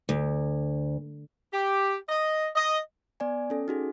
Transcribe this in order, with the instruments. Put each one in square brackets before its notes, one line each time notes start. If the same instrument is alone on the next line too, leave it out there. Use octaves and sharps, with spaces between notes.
[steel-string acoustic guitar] D2
[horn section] G4
D#5
D#5
[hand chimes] B3 D5 G#5
C#4 A4
D#4 F#4 G#4